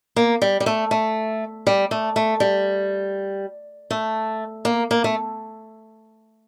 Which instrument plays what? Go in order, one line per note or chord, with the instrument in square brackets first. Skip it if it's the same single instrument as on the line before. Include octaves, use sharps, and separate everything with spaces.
[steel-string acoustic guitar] A#3
G3
G3
A3
A3
G3
A3
A3
G3
A3
A#3
A#3
A3